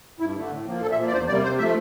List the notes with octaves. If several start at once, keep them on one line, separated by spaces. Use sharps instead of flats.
G2 E4
D3 A3
A2
F3 A#3
A#2 A4
E5
F3 A#3
D5
E2 C5
C3 G3 A#3 D5
C3 C5
F3 A3 E5